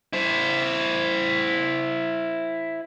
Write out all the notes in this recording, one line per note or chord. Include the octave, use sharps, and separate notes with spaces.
E4 C5